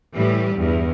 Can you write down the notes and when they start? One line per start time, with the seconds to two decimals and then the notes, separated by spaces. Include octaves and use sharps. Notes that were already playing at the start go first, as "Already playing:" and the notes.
0.14 A2 E3 G3 G4
0.56 E2 G2